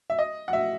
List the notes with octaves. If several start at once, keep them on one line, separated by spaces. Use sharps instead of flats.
E5
D#5
F#5
E5